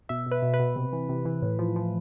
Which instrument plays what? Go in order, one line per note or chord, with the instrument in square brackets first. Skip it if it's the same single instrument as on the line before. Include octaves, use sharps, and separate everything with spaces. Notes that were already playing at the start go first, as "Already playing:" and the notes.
[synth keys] B2 E5
B2 B4
B2
B4
B2
C3
E3
C3
E3
A2
F3
F3